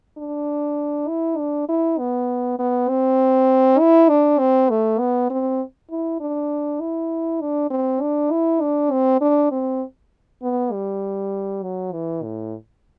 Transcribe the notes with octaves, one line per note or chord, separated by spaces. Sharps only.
D4
E4
D4
E4
B3
B3
C4
E4
D4
C4
A3
B3
C4
E4
D4
E4
D4
C4
D4
E4
D4
C4
D4
C4
B3
G3
F#3
E3
A2